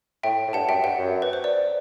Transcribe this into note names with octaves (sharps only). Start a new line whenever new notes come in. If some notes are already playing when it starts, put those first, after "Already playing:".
A2 E5 G5
A2
G2 F#5 A5
F#2 E5 G5
G2 F#5
F#2
B4
C5
D5